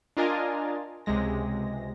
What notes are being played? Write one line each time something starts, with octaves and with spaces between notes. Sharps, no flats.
D4 F4 A#4 D#5 G#5 A6
C#2 C3 G#3 A#6